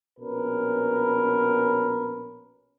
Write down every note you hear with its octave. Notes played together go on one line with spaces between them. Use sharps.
A#1 B2 C#4 A#4 B4